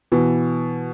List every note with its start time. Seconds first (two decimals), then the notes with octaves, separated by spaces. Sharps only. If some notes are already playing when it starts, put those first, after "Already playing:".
0.12 B2 E3